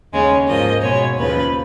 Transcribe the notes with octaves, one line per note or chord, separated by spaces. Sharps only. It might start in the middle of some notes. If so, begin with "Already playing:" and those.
D#2 C#3 G#3 C#5
G#2 F3 A#3 D#5
B2 G#3 C#5
D#2 C#3 F3 B4